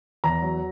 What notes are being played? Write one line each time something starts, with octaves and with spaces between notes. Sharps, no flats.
E2 A#5
F#3